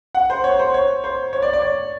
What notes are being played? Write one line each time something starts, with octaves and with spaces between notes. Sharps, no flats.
F#5
C5
C#5
C5
C#5
C5
C#5
D5
D5
C#5